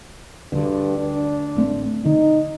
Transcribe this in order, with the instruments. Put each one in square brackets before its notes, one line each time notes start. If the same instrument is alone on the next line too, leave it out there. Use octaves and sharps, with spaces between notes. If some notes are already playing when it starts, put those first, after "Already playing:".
[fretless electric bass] D2 D3 [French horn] G2
[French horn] D4
[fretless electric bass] A1 A3 C4
[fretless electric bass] D3 [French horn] D#4